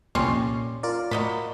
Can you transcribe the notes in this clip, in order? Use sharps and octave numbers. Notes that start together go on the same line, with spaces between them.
C2 F2 A#2 G3 C#4 C6
F4 A#4 D5
A2 F#3 D#5 B5